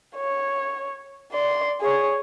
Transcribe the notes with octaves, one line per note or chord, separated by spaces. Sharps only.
C#5
D5 C6
G#4 C#5